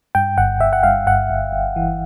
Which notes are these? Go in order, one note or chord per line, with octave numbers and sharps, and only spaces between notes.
G2 G5
G1 F#5
G1 E5
F#5
G2 F5
G1 F#5
G1
G1
E3